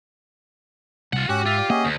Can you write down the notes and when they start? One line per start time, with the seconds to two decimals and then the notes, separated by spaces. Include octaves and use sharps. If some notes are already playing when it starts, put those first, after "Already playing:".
1.13 C2 F4 F#5
1.29 G#2 C#4 F#4 G4 F#6
1.46 F4 E5
1.58 D5
1.70 A#3 C#4 G#4 D#5 E5 F#5
1.85 D2